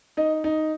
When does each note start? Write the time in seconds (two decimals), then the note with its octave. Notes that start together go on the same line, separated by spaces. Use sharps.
0.17 D#4 D#5
0.44 D#4